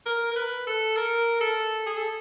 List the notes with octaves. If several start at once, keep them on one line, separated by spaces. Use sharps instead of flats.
A#4
A#4
B4
A4
A#4
A4
G#4
A4